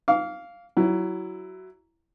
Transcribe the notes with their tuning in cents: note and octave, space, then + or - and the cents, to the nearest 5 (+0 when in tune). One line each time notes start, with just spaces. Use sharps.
F5 +0 D6 -35
F#3 +15 E4 +15